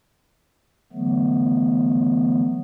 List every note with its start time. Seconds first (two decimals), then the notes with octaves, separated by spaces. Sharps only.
0.93 D3 E3 F#3 A3 B3